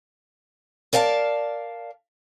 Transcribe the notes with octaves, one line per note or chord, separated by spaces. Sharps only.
A#4 D5 F5 G5 A5